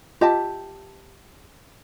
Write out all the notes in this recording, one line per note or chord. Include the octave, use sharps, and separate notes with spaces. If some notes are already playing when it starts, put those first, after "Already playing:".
F4 G4 D#5 E5 A5